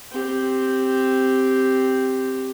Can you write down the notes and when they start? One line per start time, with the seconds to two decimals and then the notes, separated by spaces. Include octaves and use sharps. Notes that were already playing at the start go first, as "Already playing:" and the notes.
0.11 C4 G4